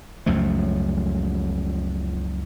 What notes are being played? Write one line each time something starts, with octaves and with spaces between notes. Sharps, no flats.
C#2 F#2 F3 A3